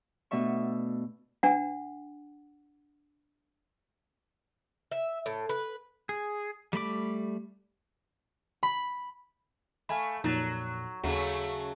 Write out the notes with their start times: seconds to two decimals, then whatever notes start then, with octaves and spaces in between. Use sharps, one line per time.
0.31 B2 A3 D4 E5 C#6
1.43 D4 F#5
4.92 E5
5.26 A2
5.49 B4
6.09 G#4
6.73 G3 A3 B5 D6
8.63 B5
9.89 A3 F5 G#5 B5
10.24 F2 A#2 F#3 D#4 A6
11.04 D#2 C#3 F#3 A3 F#4 F#5